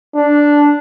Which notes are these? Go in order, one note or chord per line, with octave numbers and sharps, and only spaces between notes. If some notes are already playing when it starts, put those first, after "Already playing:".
D4